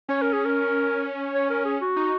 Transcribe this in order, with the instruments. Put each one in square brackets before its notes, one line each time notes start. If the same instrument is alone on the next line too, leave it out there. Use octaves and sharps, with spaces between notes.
[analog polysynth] C#4 [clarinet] C#5
[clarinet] A#4
G#4
A#4
C#5
A#4
G#4
F#4
[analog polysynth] D#4